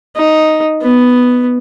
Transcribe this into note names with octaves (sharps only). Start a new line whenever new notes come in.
D#4
B3